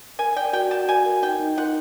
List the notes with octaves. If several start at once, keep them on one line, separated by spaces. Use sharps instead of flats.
A#4 G#5
D5 G5
F#4 G5
F#5 A5
F#4 G#5
A#4
D#4 G5
D#4
F4 F#5